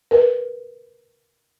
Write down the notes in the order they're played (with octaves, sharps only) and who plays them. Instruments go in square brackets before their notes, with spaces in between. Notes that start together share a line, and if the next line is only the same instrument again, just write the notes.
[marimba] A#4 B4